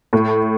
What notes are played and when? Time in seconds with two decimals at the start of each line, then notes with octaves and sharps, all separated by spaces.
0.13 A2